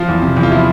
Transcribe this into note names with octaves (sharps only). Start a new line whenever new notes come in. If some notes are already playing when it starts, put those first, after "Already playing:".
Already playing: F3 F4
E2
C3
E2
F4
F3 E4